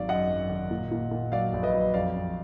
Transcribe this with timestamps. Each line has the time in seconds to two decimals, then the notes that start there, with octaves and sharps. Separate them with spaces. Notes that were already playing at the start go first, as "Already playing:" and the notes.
Already playing: G#1 D#3 F#3 D5 F5
0.08 F#2 D#5 F#5
0.30 F#2
0.50 D#3
0.71 A#2
0.91 A#2
1.11 A#2
1.32 F#3 D5 F5
1.53 A#1
1.63 B4 D#5
1.74 F#3
1.94 F2 D5 F5
2.15 F2